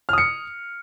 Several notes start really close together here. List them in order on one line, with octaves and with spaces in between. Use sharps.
F6 D#6 C#7